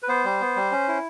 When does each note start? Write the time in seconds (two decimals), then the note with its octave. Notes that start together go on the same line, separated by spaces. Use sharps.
0.03 B4
0.08 B3 C5
0.24 G3
0.41 B3
0.56 G3
0.72 C#4
0.88 E4